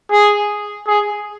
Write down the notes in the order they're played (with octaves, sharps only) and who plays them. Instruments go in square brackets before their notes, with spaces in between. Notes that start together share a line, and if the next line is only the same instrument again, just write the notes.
[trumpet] G#4
G#4